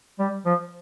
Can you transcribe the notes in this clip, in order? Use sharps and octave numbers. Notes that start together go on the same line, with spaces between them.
G3
F3